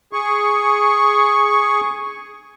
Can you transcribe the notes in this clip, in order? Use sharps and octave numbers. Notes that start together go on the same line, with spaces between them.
G#4 C#6